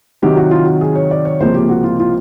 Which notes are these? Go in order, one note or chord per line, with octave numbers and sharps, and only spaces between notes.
C3 D#3 F#3 G4
F#4
F4
F#4
G#4
C#5
D5
C#5
C#2 C3 F3 A#3 C5
G4
F#4
F4
F4